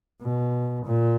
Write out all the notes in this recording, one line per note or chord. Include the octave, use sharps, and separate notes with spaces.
B2
A#2